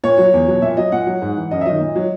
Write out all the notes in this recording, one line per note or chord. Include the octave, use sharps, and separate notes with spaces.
A#2 C#5
F#3
E2
B2 F#3
A#2 E5
F#3 D#5
A#2 F#5
F#3
G#2
E3
F#2 D#5
E5
D#3 F#3 D#5
A#2
F#3